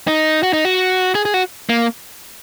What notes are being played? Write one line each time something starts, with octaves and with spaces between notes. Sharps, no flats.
D#4
F#4
D#4
F#4
G#4
G#4
F#4
A#3